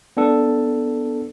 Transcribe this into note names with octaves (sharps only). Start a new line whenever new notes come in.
B3 D4 A4